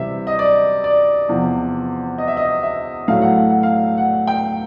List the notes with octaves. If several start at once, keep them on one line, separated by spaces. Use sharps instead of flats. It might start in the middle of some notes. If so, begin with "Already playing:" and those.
Already playing: C3 E3 G3 E5
D#5
D5
D5
E2 C3 F3
D#5
E5
D#5
E5
A2 F#3 A3 F5
F#5
F5
F#5
F5
F#5
G5